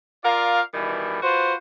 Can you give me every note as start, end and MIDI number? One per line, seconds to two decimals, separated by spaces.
0.24 0.61 65
0.24 0.61 70
0.24 0.61 74
0.24 0.61 77
0.74 1.20 47
0.74 1.20 51
0.74 1.20 52
0.74 1.20 55
1.22 1.54 65
1.22 1.54 66
1.22 1.54 71
1.22 1.54 72